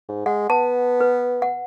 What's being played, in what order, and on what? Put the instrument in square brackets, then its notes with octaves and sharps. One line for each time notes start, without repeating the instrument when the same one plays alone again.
[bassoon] G#2
[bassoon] G#3 [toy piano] F#5
[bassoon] B3 [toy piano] A5
[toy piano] B4
F#5